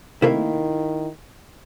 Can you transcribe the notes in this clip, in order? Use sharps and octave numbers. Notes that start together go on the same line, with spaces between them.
C3 D#3 A3 A#3 E4 F5